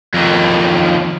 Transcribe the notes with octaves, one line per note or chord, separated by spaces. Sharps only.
F2 D#3